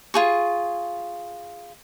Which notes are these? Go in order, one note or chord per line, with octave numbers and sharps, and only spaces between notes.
F4 G#4 C#6